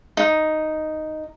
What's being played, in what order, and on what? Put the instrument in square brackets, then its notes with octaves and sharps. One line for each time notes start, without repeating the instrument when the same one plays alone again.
[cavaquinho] D#4